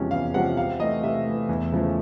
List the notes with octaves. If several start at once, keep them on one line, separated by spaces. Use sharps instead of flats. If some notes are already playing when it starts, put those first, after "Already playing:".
Already playing: E2 C3 F3 G#3 C#4
E2 F5
C3 F3 G#3 C#4 F#5
C3 F5
E3 A3 D#5
C3 E5
E3 A3
E2
C#3 F3 A3